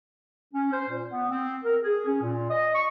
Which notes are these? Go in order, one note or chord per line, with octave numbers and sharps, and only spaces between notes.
C#4
C5
A#2
B3
C4
A#4
G#4
C#4
A#2
D#5
C#6